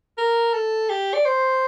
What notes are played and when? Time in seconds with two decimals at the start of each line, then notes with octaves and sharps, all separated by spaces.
0.17 A#4
0.53 A4
0.89 G4
1.14 D5
1.25 C5